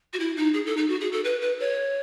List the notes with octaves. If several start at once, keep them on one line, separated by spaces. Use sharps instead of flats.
F#4
E4
D#4
G#4
A4
D#4
F#4
G#4
A4
B4
B4
C#5